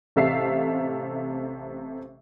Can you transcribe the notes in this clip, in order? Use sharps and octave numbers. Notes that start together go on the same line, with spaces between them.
A1 C3 A4 E5 F5 C7